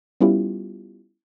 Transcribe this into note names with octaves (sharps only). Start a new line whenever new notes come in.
G3 B3 C#4 E4 F4 G4